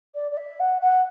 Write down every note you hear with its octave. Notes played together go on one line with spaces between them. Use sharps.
D5
D5
E5
F#5
F#5